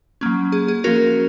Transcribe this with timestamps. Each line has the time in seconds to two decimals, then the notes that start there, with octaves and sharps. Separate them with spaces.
0.21 F#3 A#3 C#4
0.52 G#4
0.68 G#4
0.84 F3 A#3 C#4 F#4 A#4